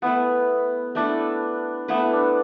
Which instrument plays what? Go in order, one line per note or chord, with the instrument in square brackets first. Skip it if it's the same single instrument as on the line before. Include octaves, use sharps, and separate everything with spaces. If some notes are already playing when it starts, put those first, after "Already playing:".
[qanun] A3 E4 B4 [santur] B3
[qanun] A3 E4 B4 [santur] D4
[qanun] A3 E4 B4 [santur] B3
[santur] D4